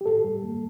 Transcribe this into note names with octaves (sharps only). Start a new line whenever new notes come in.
G4
A2 A4
G3
A#3